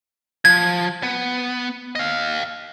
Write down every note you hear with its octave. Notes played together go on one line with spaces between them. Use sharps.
F3 G#6
B3
D#5 F5